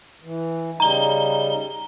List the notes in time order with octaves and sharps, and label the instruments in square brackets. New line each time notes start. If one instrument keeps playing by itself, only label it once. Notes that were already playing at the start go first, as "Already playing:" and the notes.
[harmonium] E3
[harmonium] C#3 G3 D#4 [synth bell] A#5 G7